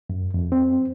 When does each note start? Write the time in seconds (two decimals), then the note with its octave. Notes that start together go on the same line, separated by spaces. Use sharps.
0.10 F#2
0.34 F2
0.52 C4